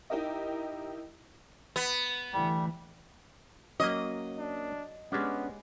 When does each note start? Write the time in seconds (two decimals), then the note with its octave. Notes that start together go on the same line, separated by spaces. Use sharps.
0.10 D#4 E4 G4 A#4 D#5
1.76 B3
2.33 D3 E3 G3 A3
3.80 F#3 A#3 C#4 D#5
4.38 D4
5.12 G#3 B3 C#4 D4 G4